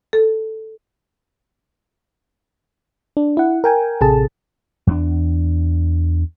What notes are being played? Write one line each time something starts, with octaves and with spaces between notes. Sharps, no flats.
A4
D4
E4 F#5
A#4 G5 G#5
A1 C3 G#4 A4 A5
E2 B3 D4